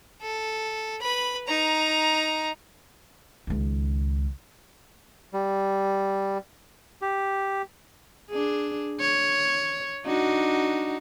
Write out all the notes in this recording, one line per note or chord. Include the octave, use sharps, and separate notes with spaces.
A4
B4 B5
D#4 A#5
C#2 D#3
G3
G4
D4 G#4
C#5
D4 D#4 F#4